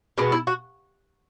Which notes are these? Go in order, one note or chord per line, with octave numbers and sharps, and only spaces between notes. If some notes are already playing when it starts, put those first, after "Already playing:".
B2 G#3 B3 D4
E4
F#4